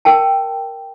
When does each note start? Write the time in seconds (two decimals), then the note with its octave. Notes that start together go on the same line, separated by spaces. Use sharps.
0.05 A#4 G5 A5